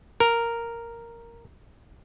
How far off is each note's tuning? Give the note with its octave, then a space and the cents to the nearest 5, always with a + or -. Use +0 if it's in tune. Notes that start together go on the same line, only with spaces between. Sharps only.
A#4 -5